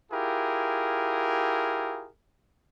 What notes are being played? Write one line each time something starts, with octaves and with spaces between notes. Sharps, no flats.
E4 F4 G4 G#4 A#4